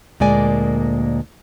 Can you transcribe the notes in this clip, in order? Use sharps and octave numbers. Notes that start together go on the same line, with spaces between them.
D2 A#2 G#3 A#3 D5 G#5